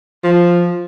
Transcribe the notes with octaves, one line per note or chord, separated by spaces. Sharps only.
F3